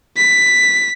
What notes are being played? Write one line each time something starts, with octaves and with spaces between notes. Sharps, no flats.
B6